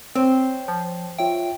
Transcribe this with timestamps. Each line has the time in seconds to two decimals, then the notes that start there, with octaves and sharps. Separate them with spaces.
0.15 C4 C5 C#5 G5
0.68 F3
1.18 F4 C#5 E5 G5